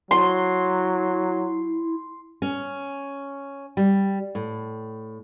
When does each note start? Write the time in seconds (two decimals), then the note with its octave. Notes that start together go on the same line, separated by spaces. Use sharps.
0.11 F#3 E4 C6
2.42 C#4
3.77 G3
4.35 A2